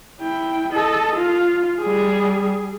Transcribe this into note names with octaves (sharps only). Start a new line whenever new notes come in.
E4 G5
A4 D#5
F4
G3 G#4